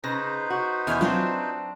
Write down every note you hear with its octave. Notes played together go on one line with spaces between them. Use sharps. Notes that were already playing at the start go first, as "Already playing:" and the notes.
C#3 D#4 B4 C5 A#6
F#4
E2 D#3 G#5 F6
F#3 C4 D4 F4